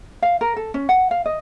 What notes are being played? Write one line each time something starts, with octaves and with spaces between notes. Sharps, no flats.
F5
A#4
A4
C#4
F#5
F5
D#5